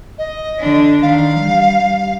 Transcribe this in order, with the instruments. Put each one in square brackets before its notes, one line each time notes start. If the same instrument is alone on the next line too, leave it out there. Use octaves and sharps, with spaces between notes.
[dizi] D#5
[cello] D3 D4
[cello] D#3 [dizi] F5
[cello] G3